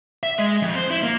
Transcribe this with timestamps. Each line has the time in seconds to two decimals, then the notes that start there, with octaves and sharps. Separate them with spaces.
0.23 E5
0.39 G#3
0.62 F2
0.75 C5
0.90 E4
1.03 A#3